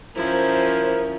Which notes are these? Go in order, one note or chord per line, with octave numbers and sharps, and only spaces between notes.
F3 C#4 E4 A#4 C5